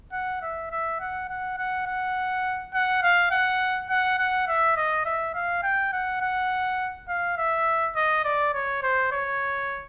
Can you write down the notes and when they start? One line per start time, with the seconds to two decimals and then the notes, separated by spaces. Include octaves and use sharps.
0.13 F#5
0.42 E5
0.71 E5
1.00 F#5
1.29 F#5
1.58 F#5
1.87 F#5
2.74 F#5
3.03 F5
3.31 F#5
3.89 F#5
4.19 F#5
4.48 E5
4.76 D#5
5.06 E5
5.35 F5
5.63 G5
5.93 F#5
6.22 F#5
7.09 F5
7.38 E5
7.96 D#5
8.25 D5
8.54 C#5
8.83 C5
9.12 C#5